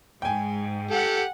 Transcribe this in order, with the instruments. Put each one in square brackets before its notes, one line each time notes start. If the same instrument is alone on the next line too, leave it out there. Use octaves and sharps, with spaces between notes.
[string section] G#2 [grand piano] G5 G#5
[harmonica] G4 A4 [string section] F#5